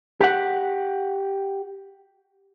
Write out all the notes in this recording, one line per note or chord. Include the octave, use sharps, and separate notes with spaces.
G4 F#5